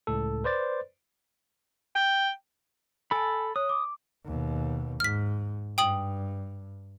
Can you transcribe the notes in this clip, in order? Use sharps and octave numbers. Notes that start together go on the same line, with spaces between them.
C#2 A2 A4
B4 C5 D5 A6
G5
A4 G#5 A5 B5
C#5 D#6
D6
D#2 B2
G#2 F6 B6
G2 G5 D#6 F#7